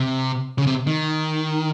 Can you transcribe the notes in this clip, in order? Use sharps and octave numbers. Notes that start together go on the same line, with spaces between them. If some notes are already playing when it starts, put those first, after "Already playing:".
Already playing: C3
C#3
C3
D#3